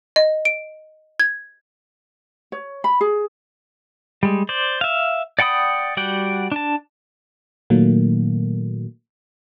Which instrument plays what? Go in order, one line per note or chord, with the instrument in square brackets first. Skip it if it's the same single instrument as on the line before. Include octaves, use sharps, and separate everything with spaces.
[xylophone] D#5
D7
G#6
[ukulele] C#5
B5
G#4
[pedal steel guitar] G3 G#3
C5 D5
E5 F5
D5 F#5 G5 B5 D#6
G3 F#4 D5 F#5 G5
D4 A5
[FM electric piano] A#2 D#3 F#3 A3 A#3